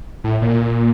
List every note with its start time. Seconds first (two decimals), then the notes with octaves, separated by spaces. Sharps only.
0.24 A2
0.42 A#2